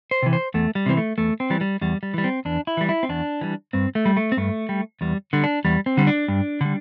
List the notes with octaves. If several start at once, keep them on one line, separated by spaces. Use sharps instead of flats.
C5
C3 E3
C5
E2 A3
G3
C3 E3 C4
A3
E2 A3
C4
E3 G3
G3
E2 G3
G3
E3 G3
C4
E2 D4
E4
E3 G3
E4
C4
E2 D4
E3 G3
G2 C4
A3
G3
A3
C4
G2 A3
G3
E2 G3
D3 G3
D4
E2 G3
C4
D3 G3
D4
G2
D3 G3